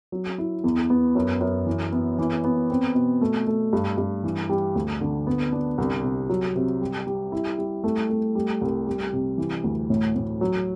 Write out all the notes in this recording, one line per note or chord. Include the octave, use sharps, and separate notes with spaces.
F#3
E4
E2
B3
F#2
F#2
E3
B3
E3
B3
C4
B2
A3
A3
G2
G2
E3
G3
D2
D3
B3
D4
C2
C3
F#3
C3
G3
G3
E4
G3
A3
A3
G3
C2
G3
C3
E3
D2
A2
A2
F#3